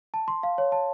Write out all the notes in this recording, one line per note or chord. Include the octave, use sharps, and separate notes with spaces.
A5
C6
F5
C#5
A5